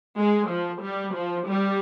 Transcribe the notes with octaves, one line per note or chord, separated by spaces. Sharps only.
G#3
F3
G3
F3
G3